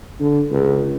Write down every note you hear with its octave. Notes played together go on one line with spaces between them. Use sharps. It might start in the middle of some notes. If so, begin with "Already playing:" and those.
D3
C#2